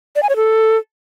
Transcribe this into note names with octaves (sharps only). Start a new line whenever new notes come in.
D5
G#5
C#5
A4